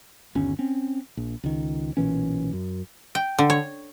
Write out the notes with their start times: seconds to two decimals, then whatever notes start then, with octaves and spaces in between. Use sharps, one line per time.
0.35 G1 D#2 C#4
0.59 C4 C#4
1.17 A#1
1.43 C#2 D#3
1.97 B1 A#2 E3 C#4
2.53 F#2
3.15 G5
3.38 D3
3.50 C#5